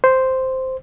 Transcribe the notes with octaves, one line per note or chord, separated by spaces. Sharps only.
C5